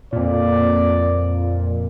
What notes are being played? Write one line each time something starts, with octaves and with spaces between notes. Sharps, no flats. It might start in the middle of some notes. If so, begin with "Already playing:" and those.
F2 A#2 D5